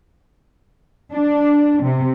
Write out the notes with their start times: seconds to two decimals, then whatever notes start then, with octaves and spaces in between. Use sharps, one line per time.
1.12 D4
1.83 C3